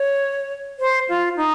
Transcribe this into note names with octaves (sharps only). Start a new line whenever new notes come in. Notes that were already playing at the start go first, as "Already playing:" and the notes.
Already playing: C#5
C5
F4
D#4